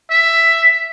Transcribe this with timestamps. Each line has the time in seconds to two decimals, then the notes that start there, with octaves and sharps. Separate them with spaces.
0.11 E5